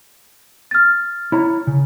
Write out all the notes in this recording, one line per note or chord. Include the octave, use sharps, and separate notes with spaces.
F6 A6
E4 C#5 A#5
C#3